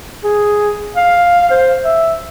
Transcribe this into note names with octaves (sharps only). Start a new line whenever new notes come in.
G#4
F5
C5
E5